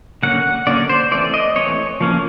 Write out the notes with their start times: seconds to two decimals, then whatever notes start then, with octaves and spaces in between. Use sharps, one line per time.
0.23 D3 F#3 A#3 C#4 F#5
0.67 D3 F#3 A#3 C#4 D5
0.89 C5
1.12 E3 A3 C4 D5
1.34 D#5
1.56 E3 A3 C4 C#5
2.01 F3 A#3 C#4